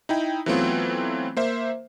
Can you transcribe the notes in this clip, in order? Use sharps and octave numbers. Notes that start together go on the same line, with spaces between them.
D#4 E4 G5
E3 F#3 A3 B3 C4 F4
A#3 C5 E5